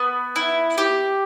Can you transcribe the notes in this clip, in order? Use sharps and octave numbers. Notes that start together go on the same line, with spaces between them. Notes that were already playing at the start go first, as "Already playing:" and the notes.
Already playing: B3 B4
E4
G4